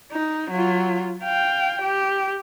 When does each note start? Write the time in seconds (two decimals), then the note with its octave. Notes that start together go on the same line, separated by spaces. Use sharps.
0.12 D#4
0.51 F#3 F4
1.24 F5 G5
1.82 G4